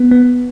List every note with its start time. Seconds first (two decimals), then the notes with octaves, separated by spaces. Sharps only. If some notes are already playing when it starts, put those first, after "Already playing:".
Already playing: B3
0.11 B3